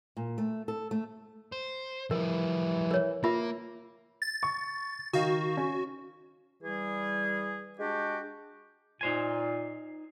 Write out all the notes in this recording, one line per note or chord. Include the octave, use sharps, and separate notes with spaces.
A#2
A3
A4
A3
C5
E3 F3 G3 A#4
A#4 C#5
A#3 F4 A#4 E5
A6
C#6
D#3 F#4 F5
C#4
E3 G3 G#4
G#3 D4 F#4 G4
A#2 D#4 C5 G#5